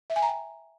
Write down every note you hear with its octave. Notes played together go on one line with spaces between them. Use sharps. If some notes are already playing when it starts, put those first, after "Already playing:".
E5
G#5
A#5
G5